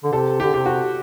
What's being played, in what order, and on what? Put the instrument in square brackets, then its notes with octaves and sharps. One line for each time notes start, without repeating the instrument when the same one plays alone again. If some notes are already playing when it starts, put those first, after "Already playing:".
[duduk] D3
[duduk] C3 [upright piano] A4
[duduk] D3 [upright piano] G4
[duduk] C3 [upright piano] G4
[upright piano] F#4